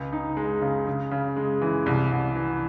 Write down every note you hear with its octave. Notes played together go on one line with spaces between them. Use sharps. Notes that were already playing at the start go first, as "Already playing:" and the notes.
Already playing: C#2
D#4
G#3
C#3
C#3
C#3
G#3
E3
C2
C2
E3